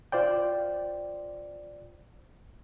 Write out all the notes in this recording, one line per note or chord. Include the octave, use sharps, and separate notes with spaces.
F4 C5 D5 G5